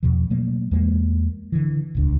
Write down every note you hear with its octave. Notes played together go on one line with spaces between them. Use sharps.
E2 B2 F3
B2 F#3 A3 A#3
E2 G#3 A#3
D3 E3
D#1 C#2 D4